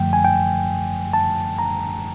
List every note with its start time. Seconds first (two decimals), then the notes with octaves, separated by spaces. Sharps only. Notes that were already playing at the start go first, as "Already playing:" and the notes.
Already playing: F#2 D3 F3 A3 G5
0.13 G#5
0.25 G5
1.13 A5
1.59 A#5